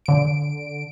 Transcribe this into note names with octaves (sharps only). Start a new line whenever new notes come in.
D3 D7